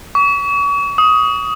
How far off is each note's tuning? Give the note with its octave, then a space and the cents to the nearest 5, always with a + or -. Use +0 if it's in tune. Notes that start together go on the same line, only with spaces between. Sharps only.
C#6 +40
D#6 +15